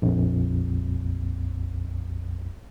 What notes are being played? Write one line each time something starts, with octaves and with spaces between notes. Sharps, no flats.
A#1 F2